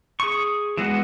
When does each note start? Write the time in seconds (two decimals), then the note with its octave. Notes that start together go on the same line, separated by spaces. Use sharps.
0.20 G#4 C#6
0.77 E3 G#3 B3 F#4